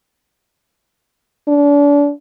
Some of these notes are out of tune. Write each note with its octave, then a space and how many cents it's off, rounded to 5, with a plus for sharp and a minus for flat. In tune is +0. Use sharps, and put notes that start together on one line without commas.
D4 -35